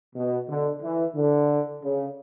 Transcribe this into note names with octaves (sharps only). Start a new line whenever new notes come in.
B2
D3
E3
D3
C#3